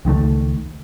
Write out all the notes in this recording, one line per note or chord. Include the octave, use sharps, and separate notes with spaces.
C#2 D#3 G#3 A3